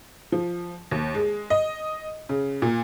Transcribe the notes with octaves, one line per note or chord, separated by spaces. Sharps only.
F3
D#2
G#3
D#5
C#3
A#2